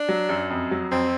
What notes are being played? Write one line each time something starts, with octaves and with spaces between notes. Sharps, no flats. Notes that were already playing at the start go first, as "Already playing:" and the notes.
Already playing: D4
F#3
F#2
F2
F#3
F2 C4